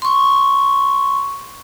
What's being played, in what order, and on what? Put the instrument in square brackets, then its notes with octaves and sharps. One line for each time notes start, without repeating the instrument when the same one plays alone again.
[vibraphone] C6 C#6